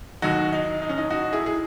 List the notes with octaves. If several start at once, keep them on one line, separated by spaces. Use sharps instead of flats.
D#2 D#3 F#3 D#4 F#4
D#4
D#4
C#4
D#4
D#4 F#4
E4 G#4
G#4